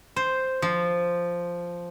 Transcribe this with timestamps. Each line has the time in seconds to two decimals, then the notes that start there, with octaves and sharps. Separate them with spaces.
0.16 C5
0.62 F3